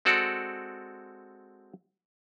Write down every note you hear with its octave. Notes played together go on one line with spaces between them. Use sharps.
G#3 C4 F#4 A4 D5